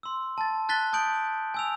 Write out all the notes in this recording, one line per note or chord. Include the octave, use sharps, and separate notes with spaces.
C6 E6
A5 A6
A5 F#6 A6 B6 G7
A5 D#6 G6 D7 F#7
G#5 E6 F7